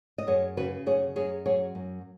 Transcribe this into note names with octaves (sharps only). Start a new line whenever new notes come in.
D#5
F#2 G#4 C#5
C#3 F#4 B4
F#2 G#4 C#5
F#2 G#4 C#5
F#3 G#4 C#5
F#2